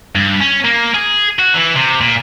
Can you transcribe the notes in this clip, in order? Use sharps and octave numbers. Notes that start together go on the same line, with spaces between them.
G2
C#4
A#3
G#4
F#4
E3
C3
A#2